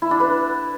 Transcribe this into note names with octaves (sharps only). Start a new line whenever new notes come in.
E4
D4
B4